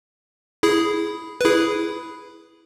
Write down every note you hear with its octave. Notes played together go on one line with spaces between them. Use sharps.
E4 G#4
B4
E4 G#4